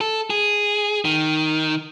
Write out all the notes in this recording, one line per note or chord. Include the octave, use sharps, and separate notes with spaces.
A4
G#4
D#3